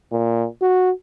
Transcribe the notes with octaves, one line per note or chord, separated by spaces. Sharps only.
A#2
F#4